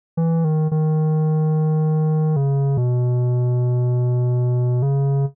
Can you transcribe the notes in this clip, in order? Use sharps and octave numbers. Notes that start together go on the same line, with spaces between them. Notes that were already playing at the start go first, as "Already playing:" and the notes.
E3
D#3
D#3
C#3
B2
C#3